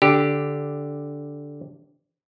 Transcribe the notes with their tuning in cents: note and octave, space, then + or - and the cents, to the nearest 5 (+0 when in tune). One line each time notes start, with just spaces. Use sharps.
D3 -10 G4 +0